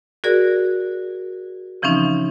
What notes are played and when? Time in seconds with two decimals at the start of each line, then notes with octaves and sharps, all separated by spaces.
0.24 F#4 G#4 A#4 D5
1.82 C#3 E3 F3 C4 C#4 D#4